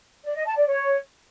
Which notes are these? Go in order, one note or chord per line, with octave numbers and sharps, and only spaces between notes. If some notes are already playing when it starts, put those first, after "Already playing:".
D5
D#5
A5
D5
C#5